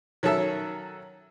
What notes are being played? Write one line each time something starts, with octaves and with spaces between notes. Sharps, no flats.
D#3 F#3 C#4 A4 E5 E6